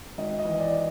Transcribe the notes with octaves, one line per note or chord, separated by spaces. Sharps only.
G#1 D#5
D#5
E3
D5